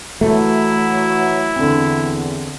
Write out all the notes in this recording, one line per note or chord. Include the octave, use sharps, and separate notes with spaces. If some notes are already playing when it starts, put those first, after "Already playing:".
E3 F#3 A3 E4
E2 D3 C4